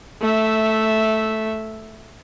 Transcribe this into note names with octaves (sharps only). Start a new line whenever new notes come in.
A3 E5